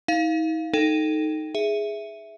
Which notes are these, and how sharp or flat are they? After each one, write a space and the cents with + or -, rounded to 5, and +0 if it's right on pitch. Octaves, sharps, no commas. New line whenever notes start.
D#4 +45 F5 +0
D#4 +0 A4 +0 G5 +0
G#4 +0 E5 +0